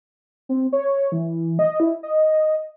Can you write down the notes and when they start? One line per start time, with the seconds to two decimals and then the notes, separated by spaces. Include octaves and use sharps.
0.49 C4
0.73 C#5
1.12 E3
1.59 D#5
1.80 E4
2.03 D#5